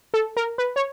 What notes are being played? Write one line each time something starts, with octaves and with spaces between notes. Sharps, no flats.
A4
A#4
B4
C#5